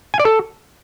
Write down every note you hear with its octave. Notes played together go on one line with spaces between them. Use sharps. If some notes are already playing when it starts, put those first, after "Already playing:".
G#5
D5
A4